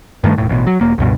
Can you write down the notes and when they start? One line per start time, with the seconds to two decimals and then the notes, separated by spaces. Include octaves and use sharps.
0.24 G2 D#3 A3
0.38 E1 A2
0.49 A1 B2
0.67 F#3
0.81 E1 A#3
0.98 C#2 G2 B2